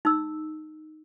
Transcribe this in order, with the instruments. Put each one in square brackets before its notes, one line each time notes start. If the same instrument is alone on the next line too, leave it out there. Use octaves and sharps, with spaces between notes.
[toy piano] D#4 E6